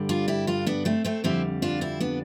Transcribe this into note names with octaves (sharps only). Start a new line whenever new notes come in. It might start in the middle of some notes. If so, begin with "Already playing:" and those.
Already playing: G2 D3 G3
D4 F4
E4 G4
D4 F4
B3 D4
A3 C4
A3 C4
F2 D3 G3 C4 E4
D4 F4
C4 E4
B3 D4